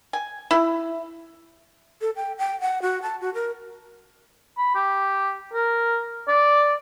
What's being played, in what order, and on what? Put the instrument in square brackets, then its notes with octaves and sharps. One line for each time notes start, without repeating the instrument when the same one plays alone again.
[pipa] G#5
E4
[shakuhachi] A4
G5
G5
F#5
F#4
A5
F#4
A#4
[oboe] B5
G4
A#4
D5